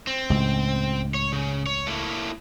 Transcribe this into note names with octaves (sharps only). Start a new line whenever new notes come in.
C4
C#2 A2
C#5
C#3
C#5
A3 A#3 E4